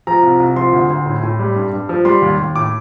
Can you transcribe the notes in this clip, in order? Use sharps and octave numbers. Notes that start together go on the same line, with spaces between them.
F3 A#5
C2
C2
F3 C6
D2
D2
A2
A2
G3
G2
G2
F3
G3 C6
D#2
D#2
A2 D6